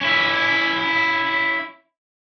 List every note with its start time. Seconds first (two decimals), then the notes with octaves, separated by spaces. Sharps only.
0.01 C#4 E4